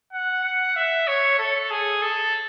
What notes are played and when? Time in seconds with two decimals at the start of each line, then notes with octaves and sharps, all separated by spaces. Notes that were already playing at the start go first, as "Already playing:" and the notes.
0.12 F#5
0.44 F#5
0.76 E5
1.08 C#5
1.39 A4
1.70 G#4
2.02 A4